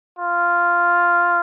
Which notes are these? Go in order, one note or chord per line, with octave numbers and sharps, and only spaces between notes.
F4